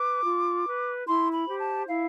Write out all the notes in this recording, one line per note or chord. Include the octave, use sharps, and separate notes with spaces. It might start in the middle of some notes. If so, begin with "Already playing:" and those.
Already playing: B4 D6
F4
B4
E4 C6
B5
G4 C5
A5
E4 F5